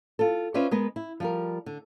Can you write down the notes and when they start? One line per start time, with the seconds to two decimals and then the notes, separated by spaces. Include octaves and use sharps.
0.19 F4 A4
0.54 C#4 F4 B4 C5 D5 E5
0.71 G#3 B3 A#4 B4
0.96 E4
1.20 F3 G3 A#4
1.66 D3